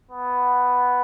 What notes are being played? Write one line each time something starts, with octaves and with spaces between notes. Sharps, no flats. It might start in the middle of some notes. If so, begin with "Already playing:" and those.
B3